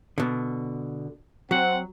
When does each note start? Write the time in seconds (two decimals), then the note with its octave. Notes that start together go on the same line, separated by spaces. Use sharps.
0.18 B2 D3
1.51 F#3 C4 F#5